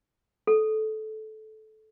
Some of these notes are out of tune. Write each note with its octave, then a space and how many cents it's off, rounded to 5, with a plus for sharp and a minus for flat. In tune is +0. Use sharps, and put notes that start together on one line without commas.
A4 -15